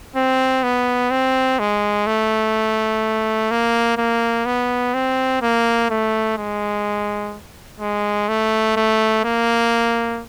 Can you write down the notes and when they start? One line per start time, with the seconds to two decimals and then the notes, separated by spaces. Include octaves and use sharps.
0.16 C4
0.63 B3
1.11 C4
1.59 G#3
2.07 A3
3.51 A#3
3.98 A#3
4.46 B3
4.94 C4
5.42 A#3
5.90 A3
6.38 G#3
7.80 G#3
8.29 A3
8.76 A3
9.24 A#3